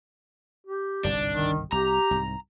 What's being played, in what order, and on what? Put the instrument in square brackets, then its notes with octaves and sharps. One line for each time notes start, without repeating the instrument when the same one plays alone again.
[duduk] G4
[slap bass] G1 C2 G#2 [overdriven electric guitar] D4
[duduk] D#3
[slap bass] C2 [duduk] G4 [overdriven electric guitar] A#5
[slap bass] C2 G#2